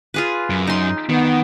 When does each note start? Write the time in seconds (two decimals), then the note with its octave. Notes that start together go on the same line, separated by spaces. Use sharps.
0.14 F4 G#4 B4
0.50 F#2
0.67 D#4 C6
1.10 D#3 B3